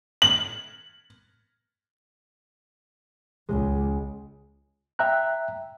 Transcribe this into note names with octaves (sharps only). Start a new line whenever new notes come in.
F#7
C#2 G#3
E5 G5 A#5 F#6